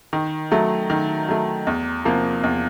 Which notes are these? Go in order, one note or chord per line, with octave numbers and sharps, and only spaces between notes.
D#3
F#3 A3
D#3
F#3 A3
E2
C3 F3 A#3
E2